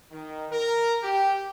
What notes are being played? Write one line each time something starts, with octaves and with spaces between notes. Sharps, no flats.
D#3
A#4
G4